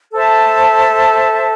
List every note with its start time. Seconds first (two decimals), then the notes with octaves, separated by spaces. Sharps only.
0.13 A4 C5 E5 A5